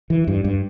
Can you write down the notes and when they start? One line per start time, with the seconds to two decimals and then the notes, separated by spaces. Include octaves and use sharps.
0.10 E3
0.28 G2
0.44 G2